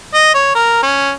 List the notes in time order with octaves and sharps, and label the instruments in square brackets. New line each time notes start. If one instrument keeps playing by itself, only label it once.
[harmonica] D#5
C#5
A#4
C#4